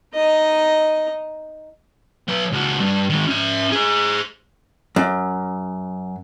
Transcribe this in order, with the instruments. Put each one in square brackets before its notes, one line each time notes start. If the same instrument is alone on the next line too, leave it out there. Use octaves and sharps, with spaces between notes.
[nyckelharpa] D#4 D#5
[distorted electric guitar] F#3 B4
C#2 F#4
G2
D#3 G#3
C#4 E5
G#4 C5
[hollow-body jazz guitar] F#2